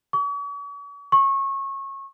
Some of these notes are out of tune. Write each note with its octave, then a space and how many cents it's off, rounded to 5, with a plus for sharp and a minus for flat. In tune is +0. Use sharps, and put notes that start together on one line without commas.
C#6 +45
C#6 -25